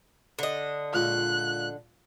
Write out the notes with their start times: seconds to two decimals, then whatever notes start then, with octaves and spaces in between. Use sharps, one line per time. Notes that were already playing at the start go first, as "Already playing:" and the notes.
0.39 D3 D#5
0.94 C#2 A#2 A#3 F#6